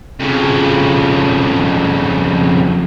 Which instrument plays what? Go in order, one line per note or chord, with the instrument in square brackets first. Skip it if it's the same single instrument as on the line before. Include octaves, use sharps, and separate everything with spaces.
[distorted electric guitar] F2 C#3